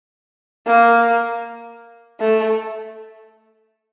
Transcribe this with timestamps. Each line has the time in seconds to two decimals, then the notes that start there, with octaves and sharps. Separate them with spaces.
0.67 A#3
2.20 A3